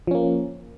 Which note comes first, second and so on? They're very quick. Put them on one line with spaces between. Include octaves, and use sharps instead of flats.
F3 C#4 A#3